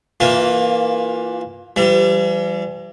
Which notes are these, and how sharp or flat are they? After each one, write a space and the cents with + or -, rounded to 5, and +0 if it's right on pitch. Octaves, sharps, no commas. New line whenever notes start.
E3 +0 A#3 +0 F4 +25
E3 +45 G3 -10